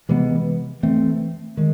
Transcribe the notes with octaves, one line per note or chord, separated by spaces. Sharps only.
C3 E3 G#3 B3
E3 A3 C4
D#3 G#3